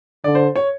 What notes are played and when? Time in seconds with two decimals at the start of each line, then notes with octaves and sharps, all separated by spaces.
0.24 D3 D5
0.35 C5
0.56 C#5